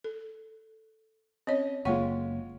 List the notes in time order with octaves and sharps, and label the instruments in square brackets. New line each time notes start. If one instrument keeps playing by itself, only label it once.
[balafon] A4
[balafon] C4 C#4 C#5 [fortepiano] D#5
[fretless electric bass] F#1 A#3 [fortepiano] G#3 F4 C#6 [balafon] C#5 F#5 G5